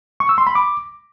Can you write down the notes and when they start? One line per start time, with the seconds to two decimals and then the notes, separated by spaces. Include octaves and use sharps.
0.20 C#6
0.29 E6
0.38 C6
0.47 B5
0.55 D6